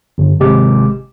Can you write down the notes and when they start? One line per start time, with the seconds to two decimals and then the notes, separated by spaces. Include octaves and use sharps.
0.18 G1
0.40 G#1 C3 G#3 G4 D6